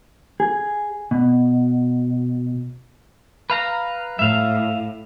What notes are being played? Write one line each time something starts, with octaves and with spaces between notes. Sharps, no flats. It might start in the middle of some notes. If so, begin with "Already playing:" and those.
G#4
B2
B4 F5 A#5
A2 E5 F5